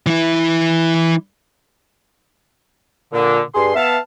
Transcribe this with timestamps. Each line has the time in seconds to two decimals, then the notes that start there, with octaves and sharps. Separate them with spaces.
0.06 E3 E4
3.13 A#2 D3
3.55 G2 G#4 C6
3.75 B3 E5 F5 A5